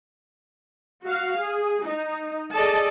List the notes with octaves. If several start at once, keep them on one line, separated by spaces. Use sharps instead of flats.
F#4 F5
G#4
D#4
G#4 A4 D5 D#5 A5